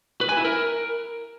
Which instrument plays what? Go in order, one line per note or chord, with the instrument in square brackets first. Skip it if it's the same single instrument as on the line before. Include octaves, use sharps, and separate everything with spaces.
[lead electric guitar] B4
G#5
E4
A#4